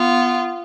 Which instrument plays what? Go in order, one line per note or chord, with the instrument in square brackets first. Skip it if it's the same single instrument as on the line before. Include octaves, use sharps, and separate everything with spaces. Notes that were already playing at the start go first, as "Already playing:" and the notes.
Already playing: [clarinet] B3 [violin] F4